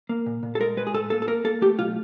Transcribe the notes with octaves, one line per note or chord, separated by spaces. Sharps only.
A#3
A#2
A#2
A4
G#3 A#4
G#3 B4
G#4
A2 A4
A#3 A4
A4
A#3 A#4
A#3 A4
A3 G4
B1 F4